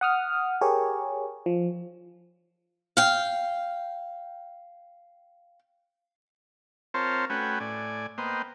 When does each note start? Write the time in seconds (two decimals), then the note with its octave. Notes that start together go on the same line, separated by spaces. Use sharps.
0.01 F#5 D#6 F6
0.61 G4 G#4 A#4 C#5
1.46 F3
2.97 F5 G5
6.94 C4 F4 A#4 C5 C#5 A5
7.30 A3 C#4 F#4 B4 G5 G#5
7.60 A2 D5 G#5
8.18 A#3 B3 C5 D#5 G5